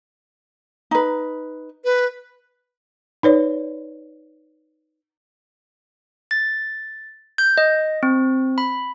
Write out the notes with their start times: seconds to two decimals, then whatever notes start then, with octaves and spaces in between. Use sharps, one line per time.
0.91 D#4 B4
1.84 B4
3.23 D#4 B4 C#5 D5
6.31 A6
7.38 G6
7.58 D#5
8.03 C4
8.58 B5